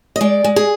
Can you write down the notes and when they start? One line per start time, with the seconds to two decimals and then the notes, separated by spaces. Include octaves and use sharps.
0.16 D#5
0.21 G#3 D5
0.44 G#3
0.56 G#4